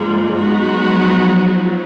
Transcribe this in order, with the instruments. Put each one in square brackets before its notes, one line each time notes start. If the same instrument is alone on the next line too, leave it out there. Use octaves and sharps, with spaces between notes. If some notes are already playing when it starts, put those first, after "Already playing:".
Already playing: [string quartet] G2 D3 F3 A#3 [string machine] G#3
[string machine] F#3 [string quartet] G#3 B3 D#4 F#4
[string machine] F3
F#3